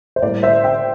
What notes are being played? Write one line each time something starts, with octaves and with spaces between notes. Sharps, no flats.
C5
A2 G3 A#3 D5
C5 E5
E5 G5